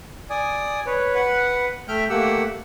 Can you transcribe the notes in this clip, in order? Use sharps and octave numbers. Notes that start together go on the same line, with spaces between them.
D5 G#5 D#6
B4 C#5
B4 F#5
A3 E5 G5 F6 G6
A3 A#3 G4 F#5 E6